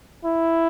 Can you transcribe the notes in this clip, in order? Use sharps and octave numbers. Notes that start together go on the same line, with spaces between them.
E4